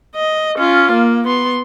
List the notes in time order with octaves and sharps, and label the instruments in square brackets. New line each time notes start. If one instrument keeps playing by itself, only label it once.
[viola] D#5
C#4 F4
A#3
B3 C6